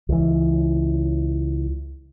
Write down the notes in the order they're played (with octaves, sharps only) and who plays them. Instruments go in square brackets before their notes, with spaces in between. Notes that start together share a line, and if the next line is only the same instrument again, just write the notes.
[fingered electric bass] C#2 E3